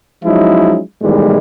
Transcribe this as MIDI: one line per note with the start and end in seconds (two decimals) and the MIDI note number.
0.24 0.79 53
0.24 0.79 54
0.24 0.79 56
0.24 0.79 61
0.24 0.79 63
0.24 0.79 64
1.02 1.38 35
1.02 1.38 45
1.02 1.38 51
1.02 1.38 52
1.02 1.38 55
1.02 1.38 56